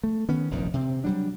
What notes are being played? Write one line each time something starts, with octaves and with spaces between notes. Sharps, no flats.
A3
D#3 B3 C#4
F1 A#1 F#2 D#3
C3 C4
F#3 G3 D4